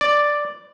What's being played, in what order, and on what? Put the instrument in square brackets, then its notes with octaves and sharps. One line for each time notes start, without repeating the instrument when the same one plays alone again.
[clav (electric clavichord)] D5